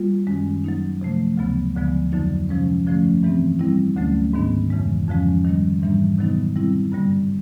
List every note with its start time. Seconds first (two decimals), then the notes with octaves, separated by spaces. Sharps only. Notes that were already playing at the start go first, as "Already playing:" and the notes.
Already playing: G3 A#3 F4
0.27 F#2 D#3 G#3 C#4
0.64 F#3 A#3 D#4
1.01 C3 F3 A3
1.37 D2 C#3 F#3 B3
1.76 D2 D3 F3 G#3 B3
2.12 F2 D3 F#3 A#3 D#4
2.49 C3 F3 G#3 C#4
2.86 G2 D3 F3 A3 C#4
3.23 G2 E3 G#3 C4
3.59 G3 C4 E4
3.96 D2 D3 F#3 A3 C#4
4.33 G#2 D#3 G#3 B3 D4
4.70 F2 C#3 E3 G#3
5.08 F2 D3 F3 G#3 C#4
5.44 D#3 G3 A#3
5.82 G#2 E3 G3 A#3 D4
6.18 C3 D#3 F#3 B3 D#4
6.56 G3 C4 E4
6.92 G2 D3 G3 A#3